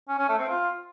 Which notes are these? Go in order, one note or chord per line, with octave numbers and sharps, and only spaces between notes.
C#4
C#4
A3
C4
F4